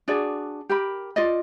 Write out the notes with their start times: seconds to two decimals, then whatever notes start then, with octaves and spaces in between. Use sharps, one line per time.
0.08 D4 F#4 G#4 D5
0.69 G4 A#4 B5
1.16 F4 D5 D#5